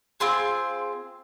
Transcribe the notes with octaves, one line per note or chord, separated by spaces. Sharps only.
C4 F4 G#4 C6